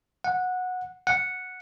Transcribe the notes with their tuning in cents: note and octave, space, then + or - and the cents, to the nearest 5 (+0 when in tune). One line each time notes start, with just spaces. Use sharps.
F#5 -15
F#5 -5